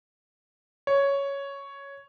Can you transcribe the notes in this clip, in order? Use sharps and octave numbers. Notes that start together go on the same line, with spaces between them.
C#5